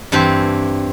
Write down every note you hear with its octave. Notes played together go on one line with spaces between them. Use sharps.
G2 E3 C4 G4 C5